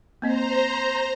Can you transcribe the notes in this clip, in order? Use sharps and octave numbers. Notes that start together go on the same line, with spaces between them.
A#3 C4 C5 D#5 A#5